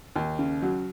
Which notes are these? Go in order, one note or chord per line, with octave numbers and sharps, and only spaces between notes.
D#2
C#3
F#3